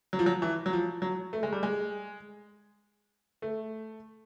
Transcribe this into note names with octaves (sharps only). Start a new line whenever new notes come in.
F#3
F3
F#3
E3
F#3
F3
F#3
A3
G#3
G3
G#3
A3